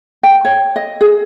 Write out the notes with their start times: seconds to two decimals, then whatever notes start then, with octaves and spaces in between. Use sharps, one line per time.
0.23 G5
0.45 C#5
0.76 D#5
1.01 G#4